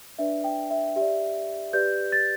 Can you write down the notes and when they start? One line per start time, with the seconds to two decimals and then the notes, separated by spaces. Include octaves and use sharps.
0.19 D4 B4 D5 E5
0.44 G5
0.71 E5
0.96 G4 D5 E5
1.73 G4 B4 D5 G6
2.12 A6